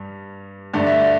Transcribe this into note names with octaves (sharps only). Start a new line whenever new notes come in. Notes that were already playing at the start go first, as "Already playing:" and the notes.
Already playing: G2 G3
G2 D3 A3 D5
E5
D5